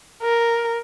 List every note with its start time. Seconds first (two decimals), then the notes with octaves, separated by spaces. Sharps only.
0.22 A#4